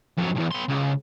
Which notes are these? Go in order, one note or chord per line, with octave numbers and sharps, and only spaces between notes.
F2 F#3
B1 E2
B3 C6
C#2